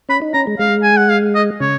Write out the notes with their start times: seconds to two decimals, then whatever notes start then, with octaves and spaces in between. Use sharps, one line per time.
0.09 C#4 B5
0.22 D#4
0.33 C#4 A#5
0.47 G#3
0.59 G#3 F5
0.83 G#5
0.97 F#5
1.09 F5
1.35 D#5
1.60 C#3 C#5